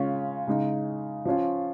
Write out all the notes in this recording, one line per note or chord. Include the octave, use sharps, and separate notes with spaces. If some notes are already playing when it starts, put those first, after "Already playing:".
Already playing: C#3 G#3 C#4 F4
C#3 G#3 D#4
F3 C#4 F4